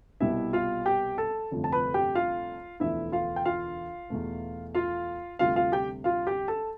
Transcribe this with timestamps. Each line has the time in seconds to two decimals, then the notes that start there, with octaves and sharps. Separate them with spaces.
0.20 C2 B2 G3 B3 E4 E5
0.53 F4 F5
0.86 G4 G5
1.18 A4 A5
1.51 G1 F2 C3 F3 A3
1.64 A5
1.72 B4 B5
1.94 G4 G5
2.15 F4 F5
2.80 E1 D2 D3 F3 B3 E4 E5
3.12 F4 F5
3.36 G5
3.45 F4 F5
4.10 E2 B2 A3
4.75 F4 F5
5.39 D2 C3 G3 F4 F5
5.56 F4 F5
5.72 G4 G5
6.04 F4 F5
6.27 G4 G5
6.48 A4 A5